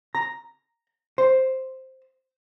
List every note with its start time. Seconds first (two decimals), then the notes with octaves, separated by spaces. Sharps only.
0.15 A#5
1.18 C5